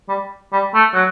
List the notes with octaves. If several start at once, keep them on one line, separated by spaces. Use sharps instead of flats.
G3
G3
A3
F#3